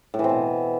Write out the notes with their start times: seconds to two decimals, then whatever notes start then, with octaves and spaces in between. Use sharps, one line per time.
0.14 A2
0.19 E3
0.24 C4
0.29 B2